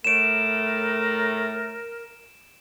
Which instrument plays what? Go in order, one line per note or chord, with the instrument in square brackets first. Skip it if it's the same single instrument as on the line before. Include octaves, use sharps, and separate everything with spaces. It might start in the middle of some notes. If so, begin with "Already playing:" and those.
[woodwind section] A2 A3 [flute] A#4 [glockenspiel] D7 E7